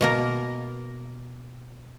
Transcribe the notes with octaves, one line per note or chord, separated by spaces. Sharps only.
B2 A#3 A#4